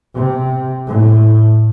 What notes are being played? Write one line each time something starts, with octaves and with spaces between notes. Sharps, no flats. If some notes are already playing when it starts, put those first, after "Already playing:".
C3
A2